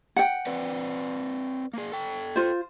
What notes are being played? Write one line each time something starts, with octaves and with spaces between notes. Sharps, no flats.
F#5 G5
C4 B4 D5
A#3 G#4
A4 G5
F4 C5